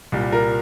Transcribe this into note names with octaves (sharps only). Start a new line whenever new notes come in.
C2 A#2 G3
A#4